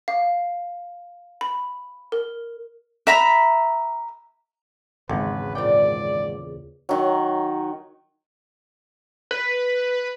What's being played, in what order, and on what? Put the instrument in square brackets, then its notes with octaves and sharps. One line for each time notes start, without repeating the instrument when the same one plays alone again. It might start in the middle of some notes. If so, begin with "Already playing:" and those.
[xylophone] F5
B5
A#4
[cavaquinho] E5 A#5 B5
[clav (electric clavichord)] G#1 [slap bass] E2 C#3 [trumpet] B4
[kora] A#2 C4 G5 [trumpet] D5
[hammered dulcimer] D#3 F#3
[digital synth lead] B4